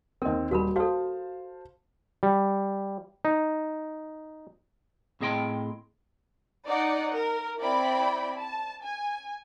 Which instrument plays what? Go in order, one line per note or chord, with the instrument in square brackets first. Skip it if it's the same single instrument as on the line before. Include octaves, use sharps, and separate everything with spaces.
[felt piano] D#2 C4 [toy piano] A#4 D#5
[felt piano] D#1 G3 [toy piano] F#4 A#4 B5
[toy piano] F#4 A4 [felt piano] C5 F5 A5
[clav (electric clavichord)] G3
D#4
[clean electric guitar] A2 C4 G#4 D#5 G5 C6
[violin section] D#4 D5 F#5
A#4
C4 E4 D5 G5 B5
A5
G#5